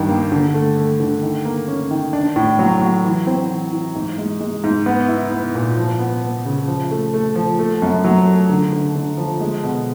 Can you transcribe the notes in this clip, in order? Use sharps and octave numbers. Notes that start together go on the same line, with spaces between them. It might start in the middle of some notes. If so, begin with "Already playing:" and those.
Already playing: G2 D#3 G3
A#3
D3
A3
A3
D3
D#3
A#3
C#4
D#3
D4
A2
F#3
F#3
E3
C4
E3
E3
G#2
G#3
G#3
G#2
B3
E4
B3
A#2
F3
B3
B3
C#3
F3
A3
A3
F3
A3
F#2
F#3
A3
D3
D3
D3
F3
G#3
B2